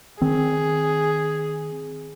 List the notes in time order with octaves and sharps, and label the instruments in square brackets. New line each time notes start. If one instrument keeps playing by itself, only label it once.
[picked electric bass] D#3 C4 [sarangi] G#4